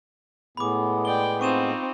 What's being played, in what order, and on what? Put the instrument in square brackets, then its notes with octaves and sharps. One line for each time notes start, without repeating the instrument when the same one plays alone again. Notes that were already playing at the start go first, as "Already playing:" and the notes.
[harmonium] A2 G#3 B3 [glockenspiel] B5 D6
[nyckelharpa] D5 G5 [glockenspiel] G7
[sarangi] C4 [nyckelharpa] D#4 F4 [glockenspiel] C#6 D#7 E7